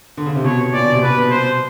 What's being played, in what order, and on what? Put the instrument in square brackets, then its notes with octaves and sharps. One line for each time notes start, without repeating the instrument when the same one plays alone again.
[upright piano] D3
C#3
C3
[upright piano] B2 [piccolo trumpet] C#5
[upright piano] A#2 [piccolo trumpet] D5
[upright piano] B2
C3
[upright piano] B2 [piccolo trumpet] B4
[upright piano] B2
[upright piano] B2 [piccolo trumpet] C5